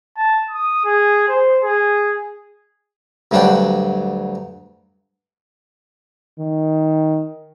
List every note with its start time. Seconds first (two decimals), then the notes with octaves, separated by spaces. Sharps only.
0.17 A5
0.51 D#6
0.85 G#4
1.28 C5
1.64 G#4
3.31 D2 G2 F#3 D4 F#5 G5
6.39 D#3